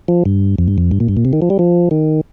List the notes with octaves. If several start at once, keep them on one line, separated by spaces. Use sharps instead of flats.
F3
G2
F2
G2
F2
G2
A#2
G2
A#2
C3
D#3
F3
G3
F3
D#3